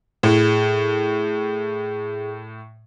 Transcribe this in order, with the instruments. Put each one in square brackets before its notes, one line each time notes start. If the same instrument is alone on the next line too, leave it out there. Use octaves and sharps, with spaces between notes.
[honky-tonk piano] A2 [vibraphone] G#4